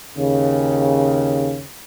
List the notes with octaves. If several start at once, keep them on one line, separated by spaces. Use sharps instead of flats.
D#2 C#3